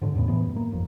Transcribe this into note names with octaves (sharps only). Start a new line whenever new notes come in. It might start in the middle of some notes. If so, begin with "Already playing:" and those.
G#2 B2 D3
E2 A2 C#3 B3
A2 E3 B3
F#2
A#3
G1 F2